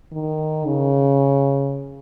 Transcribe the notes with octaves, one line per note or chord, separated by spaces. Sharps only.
D#3
C#3